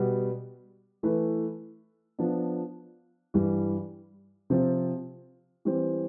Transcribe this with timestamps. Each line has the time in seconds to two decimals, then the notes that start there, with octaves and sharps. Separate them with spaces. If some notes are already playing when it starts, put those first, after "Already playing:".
Already playing: B2 G3 B3
1.03 E3 A3 E4 B4
2.19 F3 B3 D4
3.34 G2 E3 G3
4.50 C3 F3 C4 F4
5.65 E3 G3 C4